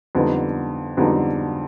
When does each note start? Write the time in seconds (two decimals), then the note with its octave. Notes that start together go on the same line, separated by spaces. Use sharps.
0.15 F2 D3 G3 B3 D#4
0.97 F2 D3 G3 B3 D#4